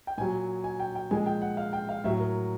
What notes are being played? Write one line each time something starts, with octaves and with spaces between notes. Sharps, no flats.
G5
A#2 F#3 G#5
G#5
G5
G5
A#2 F3 G#3 G#5
G5
F#5
F5
G5
F5
A2 F#3 E5
A#4